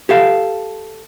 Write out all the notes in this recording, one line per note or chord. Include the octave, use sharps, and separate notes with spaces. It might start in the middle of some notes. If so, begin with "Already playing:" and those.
G4 A4 F5